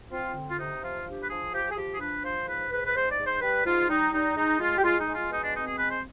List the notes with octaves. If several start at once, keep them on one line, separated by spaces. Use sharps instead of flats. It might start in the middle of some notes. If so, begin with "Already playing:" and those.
C4 F4
D3
F4
C3 D#4
F3 F4
D4 G4
B4
F3 G#4
F3 G4
G#4
F3 G4
G#4
D4 B4
F3 C5
G#2 B4
G#2 B4
B4
G#2 C5
D5
G#2
C5
G3 B4
G#2 F4
G3 D#4
G3 D#4
G#3 D#4
G#3 F4
G4
G#3 F4
D#4
G#3
F4
B2 D#4
D4
C4 D#4
G#4
G#3 B4
C5